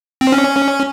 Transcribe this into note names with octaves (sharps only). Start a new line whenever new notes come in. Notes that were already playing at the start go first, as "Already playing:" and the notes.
C4
C#4